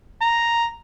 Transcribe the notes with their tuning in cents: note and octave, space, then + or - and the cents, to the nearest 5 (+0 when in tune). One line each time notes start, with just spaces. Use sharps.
A#5 +0